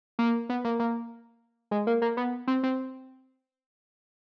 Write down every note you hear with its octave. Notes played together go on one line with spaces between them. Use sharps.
A#3
B3
A#3
A#3
G#3
A#3
A#3
B3
C4
C4